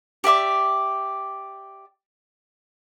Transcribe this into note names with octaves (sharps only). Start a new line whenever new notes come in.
G4 D5 E5 D6